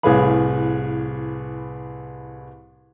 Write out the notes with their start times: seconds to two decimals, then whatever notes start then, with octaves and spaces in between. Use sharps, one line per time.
0.03 C2 A2 G#4 B4 F5 B5